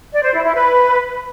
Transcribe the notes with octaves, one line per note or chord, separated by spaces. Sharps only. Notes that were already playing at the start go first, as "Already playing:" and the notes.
D5
C5
E4
E4
B4